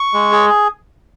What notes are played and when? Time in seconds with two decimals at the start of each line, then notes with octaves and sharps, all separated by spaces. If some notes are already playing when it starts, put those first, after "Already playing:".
Already playing: C#6
0.14 G#3
0.32 G#4